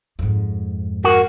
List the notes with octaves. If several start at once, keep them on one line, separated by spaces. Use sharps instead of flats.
F2 G#2
F#4 A#4